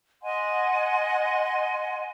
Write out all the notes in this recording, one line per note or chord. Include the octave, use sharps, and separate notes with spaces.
D#5 F#5 G#5 C6